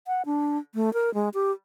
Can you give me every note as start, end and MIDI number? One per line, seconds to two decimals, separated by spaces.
0.07 0.22 78
0.26 0.58 62
0.75 0.93 57
0.94 1.13 70
1.14 1.29 56
1.34 1.51 67